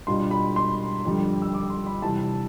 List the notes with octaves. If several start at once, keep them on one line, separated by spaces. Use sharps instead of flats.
B2 G3 D4 F4 C6
B5
C6
F2 D3 G3
E6
D6
C6
B5
E2 C3 E3 G3 A5